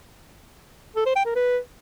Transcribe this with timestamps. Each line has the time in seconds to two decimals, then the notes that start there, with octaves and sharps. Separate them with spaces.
0.96 A4
1.06 C5
1.15 G5
1.25 A#4
1.35 B4